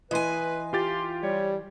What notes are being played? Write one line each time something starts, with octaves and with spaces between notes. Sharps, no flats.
E3 B4 D#5 G#5 C6
F4 G4 C6 A6
G3 C#5